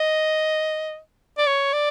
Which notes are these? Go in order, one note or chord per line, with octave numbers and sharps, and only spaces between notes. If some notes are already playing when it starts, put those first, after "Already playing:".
Already playing: D#5
D5
C#5
D5